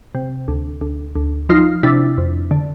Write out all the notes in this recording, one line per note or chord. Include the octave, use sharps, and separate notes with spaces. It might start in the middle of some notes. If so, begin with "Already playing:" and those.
C3
D2
D2
D2
F3 D#4 F4
C3 D4 E4
F2
D3